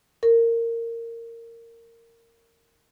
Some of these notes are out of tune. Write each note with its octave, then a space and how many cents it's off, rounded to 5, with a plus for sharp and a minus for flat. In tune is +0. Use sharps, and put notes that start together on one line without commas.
A#4 -15